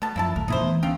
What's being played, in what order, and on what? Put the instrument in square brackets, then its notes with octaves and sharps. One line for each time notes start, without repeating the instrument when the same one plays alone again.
[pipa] B2 A5 [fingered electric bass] A3
[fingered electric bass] F#2 F3 [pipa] A#3 E4 A5
[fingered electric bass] A#1 D#2 A3 [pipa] A#4
[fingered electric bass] F2 A#2 C#3 [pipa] D#4 E4 C5
[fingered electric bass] E3 A3 B3
[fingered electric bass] D2 B3 C#4 [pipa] A3 F5 G5